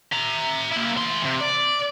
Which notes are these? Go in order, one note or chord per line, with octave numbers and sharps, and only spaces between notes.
E5 A#5
A#3 E4
E3 C6
C3
D5